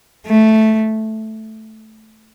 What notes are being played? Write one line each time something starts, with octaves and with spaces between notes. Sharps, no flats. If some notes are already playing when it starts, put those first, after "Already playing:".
A3